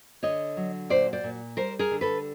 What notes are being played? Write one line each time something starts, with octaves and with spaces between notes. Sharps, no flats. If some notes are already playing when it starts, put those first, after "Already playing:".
D3 C#5 D#5
F#3
A#2 C5 D5
C5 D5
A#2
G3 A#4 C5
G#4 A#4
D3
A4 B4